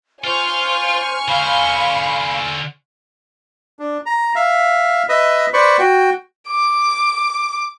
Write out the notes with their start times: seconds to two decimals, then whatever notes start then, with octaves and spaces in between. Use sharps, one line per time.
0.24 F4 C5 G#5 C#6 F6
1.28 D3 C5 F5 B5
3.79 D4
4.06 A#5
4.35 E5 F5
5.09 B4 D#5 E5
5.53 B4 C5 D5 B5 C#6
5.79 F#4 G5
6.48 D6